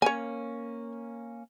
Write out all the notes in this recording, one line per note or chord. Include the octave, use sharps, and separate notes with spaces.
A#3 C#4 C#5 G#5